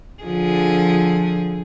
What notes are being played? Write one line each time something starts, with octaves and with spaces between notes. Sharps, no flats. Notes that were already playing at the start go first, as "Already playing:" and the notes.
D3 F3 G#4